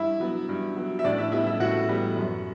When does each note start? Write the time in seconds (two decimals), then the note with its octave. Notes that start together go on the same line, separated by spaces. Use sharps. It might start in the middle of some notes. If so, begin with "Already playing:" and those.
Already playing: G2 E4 E5
0.20 F#3 B3
0.49 G2
0.76 F#3 B3
0.99 E5
1.04 A2 D4 D5
1.18 E4 E5
1.32 G3 B3 E4 E5
1.47 E4 E5
1.60 A2 F#4 F#5
1.89 G3 B3
2.16 F#2